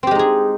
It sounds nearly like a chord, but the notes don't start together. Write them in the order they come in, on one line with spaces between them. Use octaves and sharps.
C4 G4 G#3 D#4 G#4